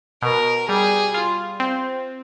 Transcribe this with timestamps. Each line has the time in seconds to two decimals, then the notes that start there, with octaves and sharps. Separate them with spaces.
0.22 B2 A#4
0.69 G3 G#4
1.14 F4
1.60 C4